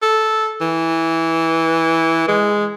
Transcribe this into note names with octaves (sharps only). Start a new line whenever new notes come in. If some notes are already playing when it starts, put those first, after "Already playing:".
A4
E3
G#3